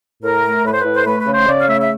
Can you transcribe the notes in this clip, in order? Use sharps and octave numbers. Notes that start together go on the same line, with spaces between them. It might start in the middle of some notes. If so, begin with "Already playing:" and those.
A2 A#4
A3
A2 B4
C5
A2 B4
C5
A3 B4
B4
C#3
C5
C#3 D5
F5
A3 E5
E5